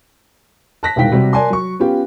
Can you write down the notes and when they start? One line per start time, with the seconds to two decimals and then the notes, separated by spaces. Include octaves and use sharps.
0.83 A5 F#6 A#6 B6
0.96 E1 C2 D#3 F5 G5 B6
1.12 C3 G3 F#4 G4
1.33 A#4 D5 G#5 A5 C6
1.50 F#3 C#6
1.79 B3 C#4 F4 G4